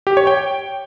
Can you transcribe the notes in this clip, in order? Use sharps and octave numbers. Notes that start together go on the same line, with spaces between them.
G4
C#5
G5